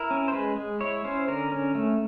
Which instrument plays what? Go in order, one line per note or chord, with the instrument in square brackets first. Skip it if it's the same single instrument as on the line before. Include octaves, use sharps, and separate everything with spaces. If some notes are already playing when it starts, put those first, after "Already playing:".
Already playing: [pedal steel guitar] E4 A#4
C#4
C5
G#3 B4
G#3
E4 C#5
C#4 C5
D3 A#4
C#4
A3